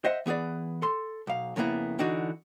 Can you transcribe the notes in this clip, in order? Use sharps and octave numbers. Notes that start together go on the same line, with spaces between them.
C5 D#5 E5 F#5
E3 B3 G#4 B4 D5
A4 C6
B1 F5
F2 C#3 A#3 B3 E4
D3 E3 D4 D#4 F#4